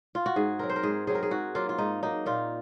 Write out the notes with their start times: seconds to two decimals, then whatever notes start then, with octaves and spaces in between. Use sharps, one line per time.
0.15 F4
0.26 F#4
0.36 G#2 G#4
0.59 F#3 C4 A#4
0.70 C5
0.76 A#4
0.83 G#2 G#4
1.07 F#3 C4 G#4
1.15 A#4
1.23 G#4
1.31 G#2 F#4
1.55 F#3 A#3 F4
1.69 F4
1.78 G#2 D#4
2.02 F#3 A#3 D#4
2.26 A#2 F4